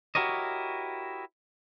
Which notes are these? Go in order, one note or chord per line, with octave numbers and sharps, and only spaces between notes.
E4 F#4 G4 A#4 C#5 D#5